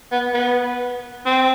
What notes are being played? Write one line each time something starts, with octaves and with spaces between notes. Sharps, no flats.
B3
B3
C4